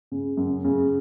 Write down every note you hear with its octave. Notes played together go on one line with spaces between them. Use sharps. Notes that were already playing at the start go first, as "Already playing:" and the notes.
C#3
F#2
C#3